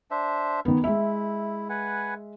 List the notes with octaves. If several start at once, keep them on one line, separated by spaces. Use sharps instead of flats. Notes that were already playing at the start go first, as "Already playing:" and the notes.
D4 C5 E5
D#3 B3
G#3 E4 E5
B4 F#5 G#5